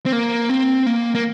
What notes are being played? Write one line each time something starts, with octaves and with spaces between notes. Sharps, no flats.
C4
A#3
C4
A#3
A#3